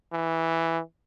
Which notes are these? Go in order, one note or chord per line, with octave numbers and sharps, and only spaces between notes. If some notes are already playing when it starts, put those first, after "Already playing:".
E3